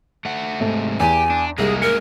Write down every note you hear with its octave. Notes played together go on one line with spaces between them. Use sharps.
A3 F#5
G#2 C3 A3
E2 G4 A4 G#5
D4
C2 G#3 A#3 D#4 G#4
A#4 C#7